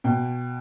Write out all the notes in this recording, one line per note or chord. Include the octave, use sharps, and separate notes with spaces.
B2 G5